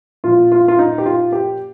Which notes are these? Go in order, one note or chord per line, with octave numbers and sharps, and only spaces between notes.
A#2 F3 F4
F4
F4
D#4
G4
F4
G4